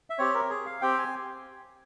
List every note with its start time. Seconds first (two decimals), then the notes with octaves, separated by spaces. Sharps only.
0.10 E5
0.18 C4 G4 C#5
0.34 A#4
0.50 G#4
0.66 F5
0.82 C4 G4 G5
0.98 G#5